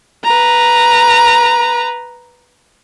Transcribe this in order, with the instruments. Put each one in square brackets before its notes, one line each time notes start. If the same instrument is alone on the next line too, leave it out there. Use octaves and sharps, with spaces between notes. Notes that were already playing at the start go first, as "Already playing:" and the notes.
[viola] B4 A#5